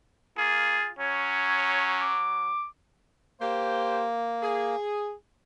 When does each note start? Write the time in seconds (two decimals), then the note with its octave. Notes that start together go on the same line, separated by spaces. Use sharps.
0.38 A#3 F4 G#4
0.99 F#3 C#4 C#5
2.00 D6
3.40 A#3 G4 C5
4.42 G#4